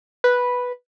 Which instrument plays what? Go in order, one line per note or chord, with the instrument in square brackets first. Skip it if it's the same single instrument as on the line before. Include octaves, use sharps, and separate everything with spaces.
[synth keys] B4